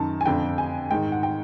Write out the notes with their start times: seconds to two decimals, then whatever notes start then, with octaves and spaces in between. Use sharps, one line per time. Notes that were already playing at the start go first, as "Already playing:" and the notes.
Already playing: F#2 D#3 A5
0.21 G#5
0.26 F2 D3 G5
0.58 G#5
0.91 G#2 D#3 G5
1.12 F#5
1.23 G5